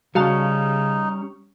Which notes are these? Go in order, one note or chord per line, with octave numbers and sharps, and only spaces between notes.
C#3 G3 C#4 D#4 F#4 F5 A5